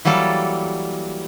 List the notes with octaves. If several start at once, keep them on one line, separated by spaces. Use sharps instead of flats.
E3 F#3 G3 A#3 A4